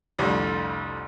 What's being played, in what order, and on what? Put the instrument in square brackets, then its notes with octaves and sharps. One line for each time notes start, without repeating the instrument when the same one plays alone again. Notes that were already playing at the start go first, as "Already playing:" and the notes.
[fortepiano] C2 F2 D3 G3 A3